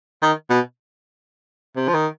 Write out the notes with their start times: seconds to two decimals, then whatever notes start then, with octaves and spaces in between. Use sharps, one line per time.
0.22 D#3
0.50 B2
1.76 C3
1.88 F3
1.94 D#3